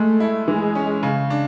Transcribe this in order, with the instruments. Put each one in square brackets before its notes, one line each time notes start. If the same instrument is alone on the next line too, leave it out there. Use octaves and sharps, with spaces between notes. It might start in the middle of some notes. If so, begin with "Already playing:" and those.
Already playing: [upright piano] G#3 [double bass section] A3
[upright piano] E4
[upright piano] E3 [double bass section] G#3
[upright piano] C#4
C#3
D4